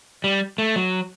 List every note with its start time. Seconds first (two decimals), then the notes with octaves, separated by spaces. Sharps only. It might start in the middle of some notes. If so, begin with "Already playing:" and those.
0.24 G3
0.58 A3
0.76 F#3